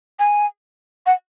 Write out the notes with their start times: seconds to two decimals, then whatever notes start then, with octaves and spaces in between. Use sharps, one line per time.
0.19 G#5
1.06 F#5